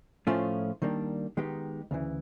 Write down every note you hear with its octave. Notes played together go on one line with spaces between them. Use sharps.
A2 F3 A3 C#4 F4
D#3 G3 A#3 D4
D#3 G#3 B3 D#4 G4
D2 C#3 E3